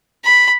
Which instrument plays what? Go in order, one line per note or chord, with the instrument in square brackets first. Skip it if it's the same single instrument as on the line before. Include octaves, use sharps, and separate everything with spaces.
[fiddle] B5